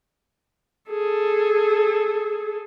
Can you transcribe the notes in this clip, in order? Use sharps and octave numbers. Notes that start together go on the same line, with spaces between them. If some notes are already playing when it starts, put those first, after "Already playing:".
G#4 A4